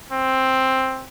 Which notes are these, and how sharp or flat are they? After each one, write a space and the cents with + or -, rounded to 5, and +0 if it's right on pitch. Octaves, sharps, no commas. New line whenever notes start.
C4 +10